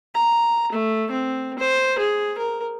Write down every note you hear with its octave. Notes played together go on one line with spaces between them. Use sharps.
A#5
A3
C4
C5
G#4
A#4